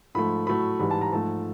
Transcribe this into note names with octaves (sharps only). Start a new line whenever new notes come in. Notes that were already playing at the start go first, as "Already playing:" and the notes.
G#2 F3 A3 B5
A2 F#3 A3 B5
G#2 E3 G3 B5
A5
A#5
G#2 F3 A3 A5